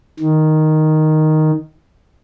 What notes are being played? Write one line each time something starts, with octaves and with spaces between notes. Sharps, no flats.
D#3